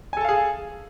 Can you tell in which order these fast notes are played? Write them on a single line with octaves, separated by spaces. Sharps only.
G#5 A4 A5 F5 G#4